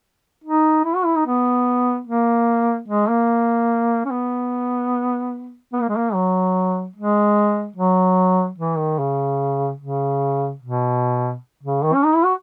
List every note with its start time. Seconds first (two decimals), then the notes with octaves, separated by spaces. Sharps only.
0.44 D#4
0.84 E4
0.95 F#4
1.05 E4
1.16 D#4
1.26 B3
2.07 A#3
2.88 G#3
3.09 A#3
4.05 C#4
4.11 B3
5.73 B3
5.82 A#3
5.89 G#3
5.96 A#3
6.14 F#3
6.96 G#3
7.76 F#3
8.58 E3
8.78 D#3
8.99 C#3
9.80 C#3
10.62 B2
11.63 C#3
11.84 D#3
11.94 C#4
12.05 D#4
12.15 E4
12.25 F#4